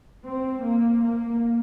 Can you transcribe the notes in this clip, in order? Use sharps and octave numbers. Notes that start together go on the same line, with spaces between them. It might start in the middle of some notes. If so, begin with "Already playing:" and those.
C4
A#3
A#3